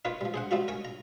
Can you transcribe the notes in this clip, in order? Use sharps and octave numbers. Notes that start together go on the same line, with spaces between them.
D#4 F4 A#4 B4 C#5
F3 G3
G#4 C5 F#5
F3 G3 C4 D#4 F4 F#4
A#4 C#5 G#5 C#6
A#5